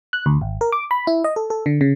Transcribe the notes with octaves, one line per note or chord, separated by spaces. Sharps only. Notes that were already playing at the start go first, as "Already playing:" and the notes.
F#6
D2
G#1
A#4
D6
B5
E4
D#5
A4
A4
D3
C#3